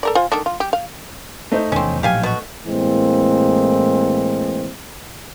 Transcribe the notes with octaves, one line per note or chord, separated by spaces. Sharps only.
A4 A#4 D5
F4 C5 G#5
D#3 A3 D4
F4
G4
F5
A3 D#4 C5
F1 E2 D#3 C4 C#4
A#1 A2 F#3 G4 F5 G#5
B2 F#4
A2 E3 G#3 A#3 C4